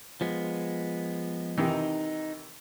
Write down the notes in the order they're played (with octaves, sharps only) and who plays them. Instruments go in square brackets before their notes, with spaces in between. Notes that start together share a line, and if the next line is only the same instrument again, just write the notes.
[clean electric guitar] F3 G#3 B3
[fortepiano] C3 D#3 E3 [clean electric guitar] D#4